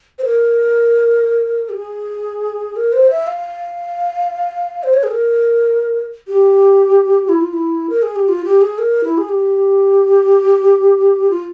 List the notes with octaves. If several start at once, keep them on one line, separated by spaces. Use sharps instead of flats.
C5
A#4
G4
G#4
A#4
C5
E5
F5
C5
C#5
G#4
A#4
G4
E4
F4
E4
A#4
G#4
G4
F4
G4
G#4
A#4
E4
G#4
G4
F4